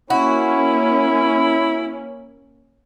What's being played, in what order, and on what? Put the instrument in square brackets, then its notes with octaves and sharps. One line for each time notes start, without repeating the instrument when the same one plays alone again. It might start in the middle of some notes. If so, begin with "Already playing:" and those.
[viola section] A#3 C#4 [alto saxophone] E4 [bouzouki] F#4 [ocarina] B5